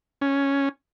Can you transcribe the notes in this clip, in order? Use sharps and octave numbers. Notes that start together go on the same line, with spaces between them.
C#4